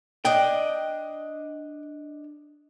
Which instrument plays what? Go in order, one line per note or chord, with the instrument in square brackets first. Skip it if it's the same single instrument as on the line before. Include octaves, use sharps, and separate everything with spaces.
[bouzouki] D4 D#5 [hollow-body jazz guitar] G5